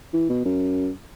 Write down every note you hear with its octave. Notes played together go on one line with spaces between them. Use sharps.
E3
B2
F#2